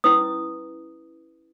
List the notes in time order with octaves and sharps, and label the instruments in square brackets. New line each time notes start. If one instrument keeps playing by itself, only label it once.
[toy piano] C#4 E4 B4 D#6